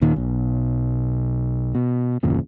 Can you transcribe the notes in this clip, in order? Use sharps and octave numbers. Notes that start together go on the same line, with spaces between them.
D#2 A#2 D#3
B1 B2
B2
G1 E2 A#2 C#3